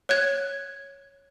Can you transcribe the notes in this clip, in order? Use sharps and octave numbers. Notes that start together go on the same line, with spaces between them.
C#5 F#6 G#6